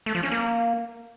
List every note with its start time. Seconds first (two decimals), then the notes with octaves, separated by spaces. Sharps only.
0.06 A3
0.15 F3
0.23 C#4
0.32 A#3